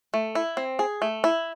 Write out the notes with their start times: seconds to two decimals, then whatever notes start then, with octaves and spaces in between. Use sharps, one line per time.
0.14 A3
0.35 E4
0.57 C4
0.79 G#4
1.02 A3
1.24 E4